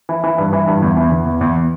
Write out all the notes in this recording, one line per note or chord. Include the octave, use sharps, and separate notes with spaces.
E3
E3
G2
E3
G2
E2
E3
E2
E2
E2